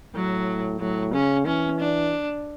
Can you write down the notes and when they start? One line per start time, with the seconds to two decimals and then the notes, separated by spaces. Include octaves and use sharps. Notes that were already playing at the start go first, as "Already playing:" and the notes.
0.15 A2 F#3
0.80 A2 F#3
1.13 C#3 C#4
1.46 E3 C#4
1.79 D4